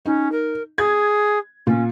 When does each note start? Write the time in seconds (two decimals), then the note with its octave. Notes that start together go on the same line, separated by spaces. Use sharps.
0.06 C#4 D#4
0.32 A#4
0.78 G#4 G#6
1.67 A#2 C#4 F4